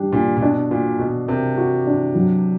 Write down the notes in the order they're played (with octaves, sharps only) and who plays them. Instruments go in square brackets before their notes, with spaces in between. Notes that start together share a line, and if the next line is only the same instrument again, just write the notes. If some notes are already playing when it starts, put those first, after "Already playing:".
Already playing: [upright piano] G3 D4 G4
[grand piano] A#2 [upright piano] D4
[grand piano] A#2
[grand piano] B2 [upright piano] D4
[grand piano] A#2 [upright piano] F#4
[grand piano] B2 [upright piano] F#4
[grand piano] C3 [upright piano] A#4
[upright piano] F#4
D4
F#3